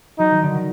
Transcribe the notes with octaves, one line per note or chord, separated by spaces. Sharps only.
F#3 D#4
D#3
D3
D#3